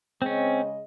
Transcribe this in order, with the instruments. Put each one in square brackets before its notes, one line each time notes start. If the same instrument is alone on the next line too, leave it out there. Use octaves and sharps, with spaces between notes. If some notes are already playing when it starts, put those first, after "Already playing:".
[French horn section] C#3 G#3 D#5 [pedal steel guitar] C4 C#4